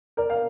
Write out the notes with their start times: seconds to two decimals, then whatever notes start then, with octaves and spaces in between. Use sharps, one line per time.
0.17 A#4 D5
0.30 F5